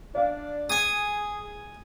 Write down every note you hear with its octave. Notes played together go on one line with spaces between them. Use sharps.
D4 D5 F5
G#4 G#5 D#6 G#6